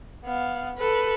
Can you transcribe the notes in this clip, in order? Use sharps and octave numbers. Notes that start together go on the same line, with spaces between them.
B3 F5
A4 B4